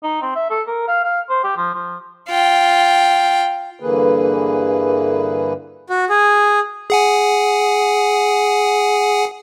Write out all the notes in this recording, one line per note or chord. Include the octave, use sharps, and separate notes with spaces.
D#4
C4
E5
A4
A#4
F5
F5
C5
G4
F3
F3
F4 G5
G2 D3 E3 A#3 G#4 B4
F#4
G#4
G#4 F#5 G#5